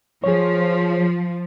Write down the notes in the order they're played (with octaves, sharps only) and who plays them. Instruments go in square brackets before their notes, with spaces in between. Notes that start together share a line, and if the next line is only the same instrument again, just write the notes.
[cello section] F3 [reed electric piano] G#4 C#5